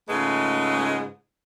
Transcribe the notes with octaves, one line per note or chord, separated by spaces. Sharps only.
G#2 C#3 G#3 A3 F4 B4